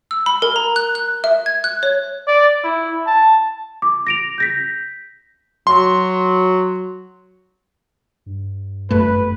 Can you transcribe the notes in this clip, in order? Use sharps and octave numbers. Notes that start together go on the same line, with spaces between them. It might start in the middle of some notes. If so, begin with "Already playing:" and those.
E6
B5
A#4
A#5
F#6
F#6
E5
G#6
F#6
C#5
D5
E4
A5
D6
A#6 D7 F7
G6 A#6 B6
F#3 C6
G2
G1 F#2 A3 B4